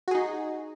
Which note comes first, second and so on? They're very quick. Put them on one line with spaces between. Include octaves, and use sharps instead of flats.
F#4 G#4 D#4